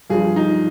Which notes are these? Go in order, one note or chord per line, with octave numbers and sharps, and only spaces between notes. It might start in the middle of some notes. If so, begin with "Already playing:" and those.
G2 F3 G#4
D#4